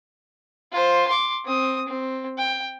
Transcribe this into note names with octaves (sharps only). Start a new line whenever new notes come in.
F4 C5
C6 D6
C4 D#6
C4
G5